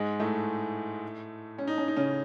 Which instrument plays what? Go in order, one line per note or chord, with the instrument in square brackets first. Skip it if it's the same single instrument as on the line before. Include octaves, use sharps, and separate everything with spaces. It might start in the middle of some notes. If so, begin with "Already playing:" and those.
Already playing: [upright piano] G#2 G#3
A2 A3
C#4
D#4
C#4
D#4
C#3 C#4